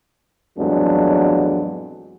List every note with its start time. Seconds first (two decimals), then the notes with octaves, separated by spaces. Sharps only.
0.58 A1 F2 F#3 G#3 B3 D4